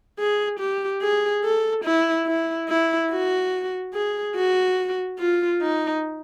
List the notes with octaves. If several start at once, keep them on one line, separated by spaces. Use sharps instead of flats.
G#4
G4
G#4
A4
E4
E4
E4
F#4
G#4
F#4
F4
D#4